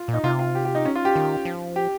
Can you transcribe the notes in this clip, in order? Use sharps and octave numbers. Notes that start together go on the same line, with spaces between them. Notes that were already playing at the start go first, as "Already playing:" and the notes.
Already playing: F4
A#2
D#4
C3 F4
F4
G4
G4
D#4
C#4
F4
G4
D#3
F3
G4